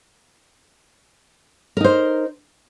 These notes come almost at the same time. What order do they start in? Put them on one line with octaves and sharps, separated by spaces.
A#4 D#4 C5